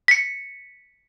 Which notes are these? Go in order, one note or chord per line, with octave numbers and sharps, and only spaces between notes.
B6 C#7